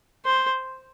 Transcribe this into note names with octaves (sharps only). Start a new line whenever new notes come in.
C5